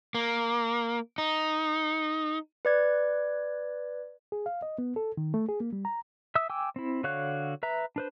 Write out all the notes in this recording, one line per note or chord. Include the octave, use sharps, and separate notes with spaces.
A#3
D#4
B4 D5 G#6
G#4
F5
D#5
B3
A4
D#3
A3
G#4
A#3
G3
A#5
E5 D#6 E6
G5 G#5 D6 E6
C4 E4
D3 F#4 C#5 F5 F#6
B4 E5 A#5
D4 B4 C5